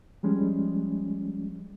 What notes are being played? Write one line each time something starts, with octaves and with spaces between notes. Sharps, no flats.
F3 G3 G#3 C#4